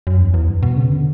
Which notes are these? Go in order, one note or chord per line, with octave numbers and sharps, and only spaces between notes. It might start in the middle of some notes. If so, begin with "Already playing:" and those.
F#2
E2
E2
G2
B2
C#3
D3